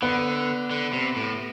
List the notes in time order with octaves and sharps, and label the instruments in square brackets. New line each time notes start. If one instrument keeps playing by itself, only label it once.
[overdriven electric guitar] D3 [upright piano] B3 B4
[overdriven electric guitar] D3
C3
A2